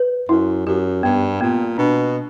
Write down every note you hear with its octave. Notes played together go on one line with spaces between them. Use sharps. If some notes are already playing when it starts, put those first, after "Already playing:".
Already playing: B4
F#2 E4
F#2 G4
G2 B3
A#2 B3
B2 D4